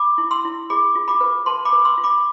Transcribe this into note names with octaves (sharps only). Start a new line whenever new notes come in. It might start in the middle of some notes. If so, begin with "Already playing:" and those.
Already playing: B5 D6
E4
C6 E6
E4
G#4 B5 D6
F4
B5 D6
B4
B4 A5 C6
B5 D6
B4
C6 E6
F4
B5 D6